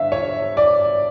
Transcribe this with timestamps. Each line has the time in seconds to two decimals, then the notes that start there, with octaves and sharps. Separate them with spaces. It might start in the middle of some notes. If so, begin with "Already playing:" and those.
Already playing: G2 D3 E5 F5
0.12 C#5
0.57 D5